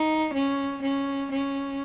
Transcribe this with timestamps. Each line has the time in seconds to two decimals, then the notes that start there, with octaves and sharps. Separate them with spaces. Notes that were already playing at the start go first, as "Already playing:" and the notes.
Already playing: D#4
0.33 C#4
0.82 C#4
1.31 C#4